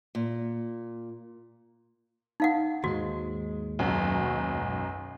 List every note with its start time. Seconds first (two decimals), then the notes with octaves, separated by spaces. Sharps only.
0.15 A#2
2.40 D#4 F5 F#5
2.84 D#2 G#2 G#3 F#4
3.79 B1 F#2 F#3